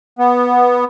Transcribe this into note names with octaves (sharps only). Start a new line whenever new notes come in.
B3